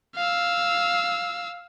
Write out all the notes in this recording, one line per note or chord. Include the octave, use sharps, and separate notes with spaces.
F5 E6